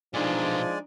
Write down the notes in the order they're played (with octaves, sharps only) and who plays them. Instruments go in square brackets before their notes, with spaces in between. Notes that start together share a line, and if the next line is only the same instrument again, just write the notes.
[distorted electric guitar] B1 A#2 [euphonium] F3 [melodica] G#3 D5 G#5 [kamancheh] D4 D#4